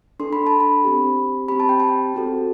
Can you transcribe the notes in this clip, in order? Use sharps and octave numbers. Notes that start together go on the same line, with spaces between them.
D4 A4 C6
B5
A5
B5
C4 G4
C4 G4 B5
A5
G5
A5
C4 F#4 A4